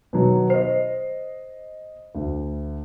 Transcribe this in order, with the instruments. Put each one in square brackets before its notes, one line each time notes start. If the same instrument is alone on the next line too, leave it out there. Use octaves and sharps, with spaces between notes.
[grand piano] B2 D#3 F#3
[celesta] C5 [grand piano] D#5 C7
[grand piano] D2